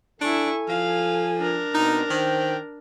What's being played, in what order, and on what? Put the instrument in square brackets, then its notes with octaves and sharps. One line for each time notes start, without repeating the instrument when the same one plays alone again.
[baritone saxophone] D4 [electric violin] E4 C#6 [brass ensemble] A4 G#5
[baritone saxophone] F3 [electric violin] F5
[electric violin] D4 A#4
[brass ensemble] B2 C4 [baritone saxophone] D#4
[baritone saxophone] D#3 [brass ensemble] C5 G5